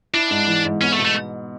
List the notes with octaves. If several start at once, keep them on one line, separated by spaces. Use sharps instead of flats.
D4 E4
G#2
E3
G#2
B3 C#4
A3
B2
A3